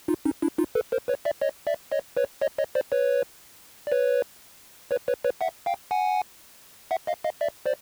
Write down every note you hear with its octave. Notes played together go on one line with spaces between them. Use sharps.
D#4 F4
C#4 D#4
D4 E4
D#4 F4
A4 B4
A#4 C5
B4 C#5
D5 E5
C#5 D#5
D5 E5
C#5 D#5
B4 C#5
C#5 D#5
C#5 D#5
C5 D5
B4 C#5
D5
B4 C#5
B4 C#5
B4 C#5
B4 C#5
E5 F#5
F5 G5
F#5 G#5
E5 F#5
D#5 F5
D#5 F5
D5 E5
C5 D5